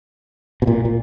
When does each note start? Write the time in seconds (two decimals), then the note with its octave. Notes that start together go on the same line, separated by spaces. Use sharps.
0.62 B2
0.67 A#2
0.85 A#2